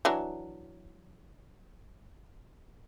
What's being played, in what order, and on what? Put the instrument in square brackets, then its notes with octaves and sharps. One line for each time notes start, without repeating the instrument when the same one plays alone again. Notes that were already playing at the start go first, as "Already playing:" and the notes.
[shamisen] E3 F#3 D4